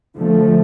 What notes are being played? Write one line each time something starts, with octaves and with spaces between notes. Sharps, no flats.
D3 F3 A3